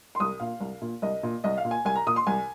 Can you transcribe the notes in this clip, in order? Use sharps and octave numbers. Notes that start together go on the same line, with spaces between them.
C6
C2 D#6
A#2 F5
C2
A#2
C2 D#5
A#2
C2 D#5
F5
A#2
G#5
C2 G#5
A#5
A#2 D#6
C6
C2 G#5